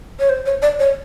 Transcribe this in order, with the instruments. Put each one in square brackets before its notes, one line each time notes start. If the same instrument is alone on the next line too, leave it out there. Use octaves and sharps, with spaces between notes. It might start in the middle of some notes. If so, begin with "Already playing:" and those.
[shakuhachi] C#5
C5
C#5
D5
C#5